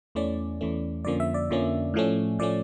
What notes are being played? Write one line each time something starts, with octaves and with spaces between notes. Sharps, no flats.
E2 E3 A3 C#4 D5
E2 E3 A3 C#4
F2 D3 F3 A#3 C#4 D5
E5
D5
F2 D3 F3 A#3 C#4
A2 F3 A3 C#4
A2 F3 A3 C#4 D5